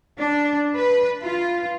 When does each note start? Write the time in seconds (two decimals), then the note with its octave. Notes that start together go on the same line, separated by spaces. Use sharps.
0.18 D4
0.74 B4
1.23 F4